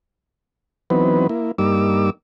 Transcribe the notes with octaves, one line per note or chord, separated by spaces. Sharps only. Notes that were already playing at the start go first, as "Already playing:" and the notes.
E3 F#3 B3 C4 D#4 B4
A#3 E4
G2 G3 A#3 D#4 D6 E6